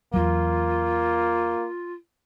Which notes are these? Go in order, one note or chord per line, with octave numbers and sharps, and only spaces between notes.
E2 F#3 A#3 F4